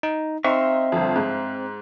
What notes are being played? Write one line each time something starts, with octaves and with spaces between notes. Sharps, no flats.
D#4
C4 D#4 E5 F5 C6 C#6
G1 F2
G#2